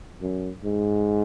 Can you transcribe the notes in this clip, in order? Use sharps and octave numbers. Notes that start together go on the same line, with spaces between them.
F#2
G#2